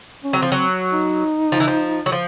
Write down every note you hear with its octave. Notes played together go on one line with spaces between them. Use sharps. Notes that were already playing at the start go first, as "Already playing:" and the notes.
C#4
F#3 C4
F3
F#3
D#4
F3
E3
F3
F#3
F3